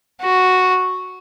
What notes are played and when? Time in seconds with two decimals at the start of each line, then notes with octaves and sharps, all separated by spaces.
0.21 F#4